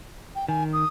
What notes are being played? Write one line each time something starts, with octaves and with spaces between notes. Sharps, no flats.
G5
D#3 G#5
D#6